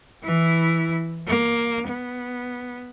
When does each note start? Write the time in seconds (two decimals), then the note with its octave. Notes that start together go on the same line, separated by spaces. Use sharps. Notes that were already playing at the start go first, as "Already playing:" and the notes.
0.23 E3 E4
1.28 A#3
1.88 B3